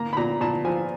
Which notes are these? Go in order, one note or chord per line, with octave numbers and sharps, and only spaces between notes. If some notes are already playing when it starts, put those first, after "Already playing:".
Already playing: A#3 A#5
B5
A#2 A#5
A#2 A5
F3 G#5